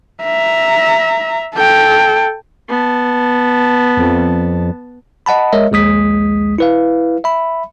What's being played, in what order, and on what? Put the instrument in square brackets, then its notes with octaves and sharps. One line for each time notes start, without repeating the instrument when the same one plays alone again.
[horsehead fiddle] E5 A#5
A4 G5
[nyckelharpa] B3 A5
[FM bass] F2
[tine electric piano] D#5 F#5 A5 B5
G#3 A#4 C#5 D#5 E5
A#1 D#2 G#3 D#6 B6
E4 B4 F5
E5 B5